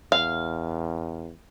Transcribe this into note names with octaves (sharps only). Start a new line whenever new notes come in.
E2 F5